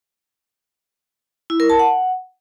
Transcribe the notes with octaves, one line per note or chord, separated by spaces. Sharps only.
E4
A#4
A5
F#5